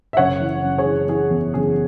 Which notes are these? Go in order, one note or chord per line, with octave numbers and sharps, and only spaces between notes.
E5
F#1 C#5 F#5
E3
F#1
G#4 C#5
E3
E3 G#4
E2
F#1 G#4